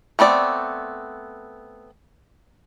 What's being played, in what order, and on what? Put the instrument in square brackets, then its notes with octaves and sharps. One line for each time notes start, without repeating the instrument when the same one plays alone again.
[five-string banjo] A3 B3 C4 D5